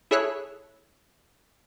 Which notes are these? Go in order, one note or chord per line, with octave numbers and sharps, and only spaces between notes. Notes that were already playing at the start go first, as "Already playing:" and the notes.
E4 G#4 A4 C#5 E6 F#6